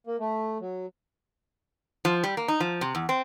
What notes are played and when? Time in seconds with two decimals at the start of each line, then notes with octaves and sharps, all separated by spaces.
0.07 A#3
0.20 A3
0.61 F#3
2.05 F3
2.24 G3
2.37 A#3
2.48 D#4
2.60 F3
2.81 C3
2.95 E2
3.09 C4